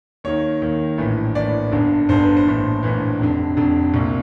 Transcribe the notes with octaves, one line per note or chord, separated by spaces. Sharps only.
D#2 D#3 C#5
D#2 D#3
A#1 A2 E3
A#1 A2 E3 D5
G1 G2 D3
G1 G2 D3 C5
B4
C5
A#1 A2 E3
A#1 A2 E3
F1 F2 D3
F1 F2 D3
C2 A#2